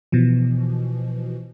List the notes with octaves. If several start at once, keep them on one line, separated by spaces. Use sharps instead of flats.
B2 E3 F3